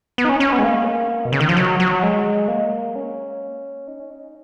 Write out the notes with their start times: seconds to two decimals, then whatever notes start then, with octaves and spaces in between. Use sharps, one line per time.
0.18 B3
0.25 D#4
0.29 C#4
0.40 C#4
0.52 B3
0.59 G#3
0.64 A#3
1.25 B2
1.32 C#3
1.40 D#3
1.49 F3
1.57 F#3
1.80 F#3
2.03 G#3
2.48 A#3
2.96 C#4
3.87 D#4
3.99 C#4
4.10 D#4